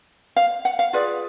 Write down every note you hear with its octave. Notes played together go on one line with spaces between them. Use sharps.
F5
F#5
F5
F4 G#4 B4 D5